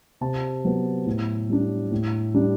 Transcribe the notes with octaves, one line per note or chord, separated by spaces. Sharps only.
C3 A5
F#3 B3
A2
G3 D4
A2
G3 D4